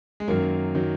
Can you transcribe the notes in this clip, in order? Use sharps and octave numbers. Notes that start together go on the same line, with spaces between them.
G#3
F#2 D#3 F#3 A#3
D#3 F#3